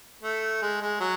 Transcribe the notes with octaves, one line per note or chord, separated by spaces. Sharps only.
A3
G#3
G#3
F#3